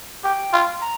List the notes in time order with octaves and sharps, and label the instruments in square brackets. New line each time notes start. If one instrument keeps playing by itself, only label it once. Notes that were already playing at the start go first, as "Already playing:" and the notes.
[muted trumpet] G4 [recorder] G5
[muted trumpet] F4
[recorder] A#5